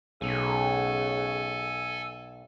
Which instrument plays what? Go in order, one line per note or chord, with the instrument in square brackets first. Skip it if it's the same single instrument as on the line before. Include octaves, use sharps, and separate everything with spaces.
[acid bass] B1 [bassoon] C#3 [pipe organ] A4 G#5